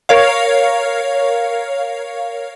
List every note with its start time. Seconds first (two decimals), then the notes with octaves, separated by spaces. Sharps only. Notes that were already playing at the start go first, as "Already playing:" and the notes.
0.09 A#4 C#5 F5